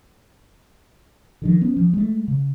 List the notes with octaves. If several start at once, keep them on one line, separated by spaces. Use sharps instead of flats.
D3 D#3 F3
B3 C#4
F3
G#3 A3
C#3